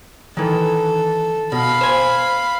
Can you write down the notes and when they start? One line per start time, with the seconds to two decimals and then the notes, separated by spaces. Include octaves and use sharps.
0.37 D#3 E3 A4
1.52 B2 F5 B5
1.81 C5 G#5